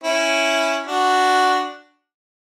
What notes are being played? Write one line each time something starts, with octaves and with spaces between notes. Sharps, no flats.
C#4 E4
D4 F#4